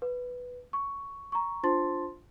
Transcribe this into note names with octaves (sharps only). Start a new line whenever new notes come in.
B4
C#6
A#5 C#6
D4 F4 C5 A5 C6 A6